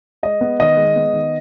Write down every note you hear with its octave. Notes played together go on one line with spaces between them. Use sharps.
G#3 D#5
B3
D#3 D#5
G#3
B3
D#3